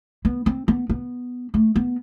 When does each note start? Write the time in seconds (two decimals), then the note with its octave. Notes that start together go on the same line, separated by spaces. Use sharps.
0.25 B3
0.46 C4
0.68 B3
0.89 B3
1.54 A3
1.76 B3